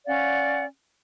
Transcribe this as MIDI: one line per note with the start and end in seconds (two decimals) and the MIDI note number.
0.06 0.64 61
0.06 0.64 74
0.06 0.64 77
0.06 0.64 78